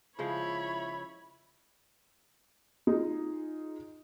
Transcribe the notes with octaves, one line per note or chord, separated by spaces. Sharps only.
C#3 F3 G#3 E4 C#5 B5
D#4 F4 G#4